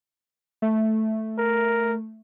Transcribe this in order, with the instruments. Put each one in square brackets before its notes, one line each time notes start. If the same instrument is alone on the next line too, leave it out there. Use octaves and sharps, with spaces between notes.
[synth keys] A3
[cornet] A#4